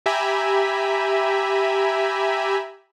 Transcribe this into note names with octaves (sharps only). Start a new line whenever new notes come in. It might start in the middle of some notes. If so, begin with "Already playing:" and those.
G4 E5 G#5 A#5 B5